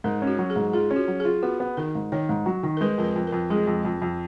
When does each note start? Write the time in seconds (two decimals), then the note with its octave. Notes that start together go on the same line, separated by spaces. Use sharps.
0.04 G#2 A#4
0.22 C#4
0.27 F#4
0.39 F#3
0.50 G#4
0.56 G#2
0.73 F4 G#4
0.91 C#4
0.96 F#4
1.08 F#3
1.20 G#4
1.25 F4
1.43 B3 F#4
1.60 B3
1.77 D#3 A#4
1.95 G#2
2.12 D#3 C#5
2.29 G#2
2.46 F#3
2.63 D#3
2.77 A#4
2.81 G#3 B4
2.98 F2 A#4
3.04 B4
3.16 F2
3.27 A#4
3.33 F2
3.50 G#3 G#4
3.67 F2
3.85 F2
4.02 F2